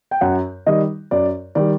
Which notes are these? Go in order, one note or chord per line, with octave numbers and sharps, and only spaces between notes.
G5
F#2 F#5
D#3 G3 D#5
F#2 D5
D#3 G3 D5